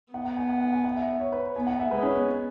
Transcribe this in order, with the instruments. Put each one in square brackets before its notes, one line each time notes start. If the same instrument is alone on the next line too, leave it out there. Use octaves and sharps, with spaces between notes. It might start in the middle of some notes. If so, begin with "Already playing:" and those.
[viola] B3 [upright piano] F#5
[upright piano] F#5
G#5
F#5
F#5
G#5
F#5
E5
E5
C#5
B4
[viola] B3 [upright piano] G#5
[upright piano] F#5
E5
[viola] G#3 [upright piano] B4
[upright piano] C#4
B3